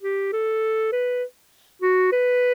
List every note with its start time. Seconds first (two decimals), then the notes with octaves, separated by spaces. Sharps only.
0.02 G4
0.33 A4
0.92 B4
1.82 F#4
2.12 B4